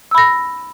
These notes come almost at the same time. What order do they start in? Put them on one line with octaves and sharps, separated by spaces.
E6 B5 A#6